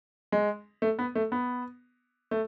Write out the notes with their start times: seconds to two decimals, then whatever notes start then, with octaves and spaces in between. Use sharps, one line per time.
0.32 G#3
0.82 A3
0.99 B3
1.15 A3
1.32 B3
2.31 A3